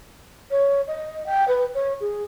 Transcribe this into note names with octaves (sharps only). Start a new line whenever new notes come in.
C#5
D#5
G5
B4
C#5
G#4